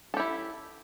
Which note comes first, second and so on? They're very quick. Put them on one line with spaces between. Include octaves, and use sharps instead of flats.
A4 G4 E4